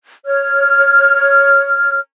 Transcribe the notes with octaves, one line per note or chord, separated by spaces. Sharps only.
C#5 F6